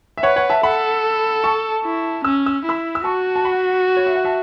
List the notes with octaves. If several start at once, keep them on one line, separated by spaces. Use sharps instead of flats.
E5
B4 C#5 F#5
C#5 F#5
E5 A5
A4 F#5 B5
A5 C#6
E4
C#4 E6
E6
E4 B5 E6
E6
F#4 A5 C#6
A5
F#5 B5
C#5
E5
F#5
E5 A5